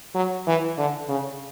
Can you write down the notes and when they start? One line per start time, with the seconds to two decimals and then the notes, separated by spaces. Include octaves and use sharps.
0.15 F#3
0.47 E3
0.78 D3
1.09 C#3